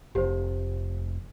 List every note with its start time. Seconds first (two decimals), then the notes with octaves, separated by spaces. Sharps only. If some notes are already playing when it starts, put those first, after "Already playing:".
0.15 F1 G4 C5